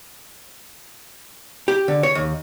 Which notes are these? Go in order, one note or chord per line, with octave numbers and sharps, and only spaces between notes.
G4
D3
C#5
D#2